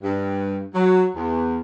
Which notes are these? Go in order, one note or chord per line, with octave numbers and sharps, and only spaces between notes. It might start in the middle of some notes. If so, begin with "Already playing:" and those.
G2
F#3
E2